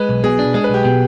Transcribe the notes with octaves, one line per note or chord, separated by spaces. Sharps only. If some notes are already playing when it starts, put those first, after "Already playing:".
Already playing: G#3 B4
B1
B2 G#4
D4
G#3 G#4
B4
B1 G4
B2 G4